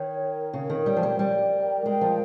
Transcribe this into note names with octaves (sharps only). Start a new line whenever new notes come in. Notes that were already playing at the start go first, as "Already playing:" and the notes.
Already playing: D#3 C#5
A#4
C#3 C#5
D#3
G3 G5
F3
G3
G3 G5
A#4
G#3 G5
F3